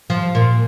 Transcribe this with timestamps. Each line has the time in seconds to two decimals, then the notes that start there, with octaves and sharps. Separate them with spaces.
0.10 F3
0.35 A#2